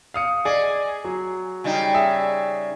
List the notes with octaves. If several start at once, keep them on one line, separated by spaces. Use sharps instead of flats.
F5 D#6 C#7
G#4 D5 D#5
F#3
C#3 G3 D#4
G#4 E5